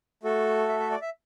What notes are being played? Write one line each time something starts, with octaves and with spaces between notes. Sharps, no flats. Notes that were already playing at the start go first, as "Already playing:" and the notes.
A3 F#4 A4
E5
E5
D5
E5